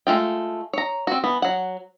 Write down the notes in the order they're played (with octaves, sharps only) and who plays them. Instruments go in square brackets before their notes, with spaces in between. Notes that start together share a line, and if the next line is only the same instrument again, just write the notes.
[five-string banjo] G#3 A3 F4 G5
C#5 A#5
C4 F#4
E3 B3
F#3 F#5